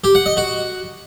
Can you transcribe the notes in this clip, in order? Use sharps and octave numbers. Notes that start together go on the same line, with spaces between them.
G4
F#5
D#5
F#4